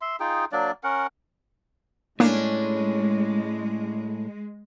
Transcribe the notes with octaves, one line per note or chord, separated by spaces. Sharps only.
E5 C6
D#4 F4 G#4 G5
F#3 A#3 D4 D5
C#4 A#4 F#5
A2 G#3 A#3 C#4 D4